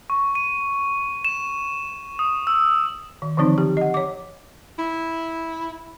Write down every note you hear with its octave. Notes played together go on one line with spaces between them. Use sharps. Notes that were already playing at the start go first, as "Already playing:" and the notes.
C#6
D#7
E7
D#6
E6
D#3
D3 E3 F3 C4 D#4
G4
D#5 F#5
C#5 D6
E4